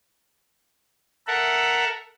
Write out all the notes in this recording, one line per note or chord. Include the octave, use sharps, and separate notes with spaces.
A4 A#4 E5 F#5